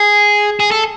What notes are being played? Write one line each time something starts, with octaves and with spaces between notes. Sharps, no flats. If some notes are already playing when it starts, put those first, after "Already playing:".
Already playing: G#4
G#4
A4